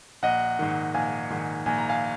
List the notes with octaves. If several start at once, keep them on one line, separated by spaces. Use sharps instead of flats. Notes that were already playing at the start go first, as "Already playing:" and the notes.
A#1 D#5 F#5
G#2 D#3
A#1 F5 G#5
G#2 D#3
A#1 G#5
A#5
F5 G#5